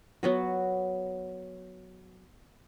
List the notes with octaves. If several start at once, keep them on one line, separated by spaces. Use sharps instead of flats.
F#3 B3 F#4